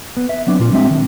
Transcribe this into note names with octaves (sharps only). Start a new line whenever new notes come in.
B3
E5
F#3 B3 C4 D4
A#2 F4
G3 G#3 C4 D4 E5
D#3